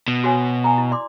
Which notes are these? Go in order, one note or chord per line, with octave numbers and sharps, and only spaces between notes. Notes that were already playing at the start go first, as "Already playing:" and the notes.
B2
F#4 C#5 G#5
G#5 A#5
E4
D5 C6 D6